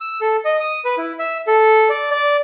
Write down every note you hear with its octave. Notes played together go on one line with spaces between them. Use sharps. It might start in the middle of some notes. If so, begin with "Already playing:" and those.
E6
A4
D#5
D#6
B4
E4
E5
A4
D5
D5